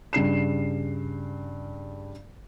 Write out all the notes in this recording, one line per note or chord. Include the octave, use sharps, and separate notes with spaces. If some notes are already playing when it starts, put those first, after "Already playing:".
G2 C#3 C7 E7